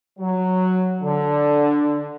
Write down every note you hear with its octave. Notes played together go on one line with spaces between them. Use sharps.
F#3
D3